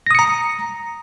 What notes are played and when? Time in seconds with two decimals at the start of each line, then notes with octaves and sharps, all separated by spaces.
0.07 A#6
0.11 D#6
0.15 C#7
0.19 A#5